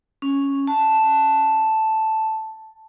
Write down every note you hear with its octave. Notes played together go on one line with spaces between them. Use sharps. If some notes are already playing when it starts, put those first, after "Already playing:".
C#4
A5